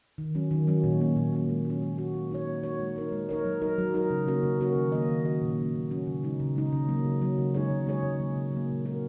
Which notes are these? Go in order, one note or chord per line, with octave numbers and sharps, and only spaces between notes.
D#3
F#3 C#4
D#3
F#3 C#4
A#2
A#3 C#4
A#2
A#3 C#4
G#3
C#4 F#4
G#3
C#4 F#4
A#3
D#4 F#4 C#5
A#3
D#4 F#4 C#5
G#3
D#4 A#4 C#5
G#3
D#4 A#4 C#5
F#3
D#4 A#4
F#3
D#4 A#4
C#3
A#3 C#4 F#4 A#4
C#3
A#3 C#4 F#4 A#4
D#3
A#3 F#4 D#5
D#3
A#3 F#4 D#5
A#2
F#3 C#4 F#4
A#2
F#3 C#4 F#4
C#3
G#3 D#4
C#3
G#3 D#4
C#3
F#3 A#3
C#3
F#3 A#3
C#3
G#3 D#4 G#4 C#5
C#3
G#3 D#4 G#4 C#5
C#3
F#3 A#3
C#3
F#3 A#3
A#2
G#3 C#4 F#4 A#4